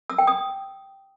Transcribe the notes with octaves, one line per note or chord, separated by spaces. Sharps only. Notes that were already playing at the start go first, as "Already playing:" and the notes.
E6
G5
D#6